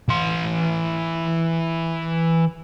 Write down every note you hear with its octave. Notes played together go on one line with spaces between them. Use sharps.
E3 C6